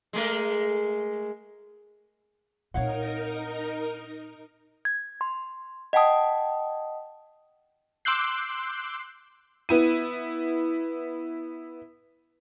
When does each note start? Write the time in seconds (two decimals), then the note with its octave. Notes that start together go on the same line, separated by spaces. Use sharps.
0.13 G#3 A3 A#4
2.74 A#2 C4 D#4 A#4 C#5 F5 F#5
4.85 G#6
5.21 C6
5.93 D#5 F#5 G5 A5 D#6
8.05 C6 D6 E6 F#6 G6 C7
9.69 B3 E4 D#7